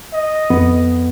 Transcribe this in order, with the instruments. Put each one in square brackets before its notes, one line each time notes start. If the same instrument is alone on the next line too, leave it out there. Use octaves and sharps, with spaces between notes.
[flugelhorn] D#5
[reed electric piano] F2 B3 B4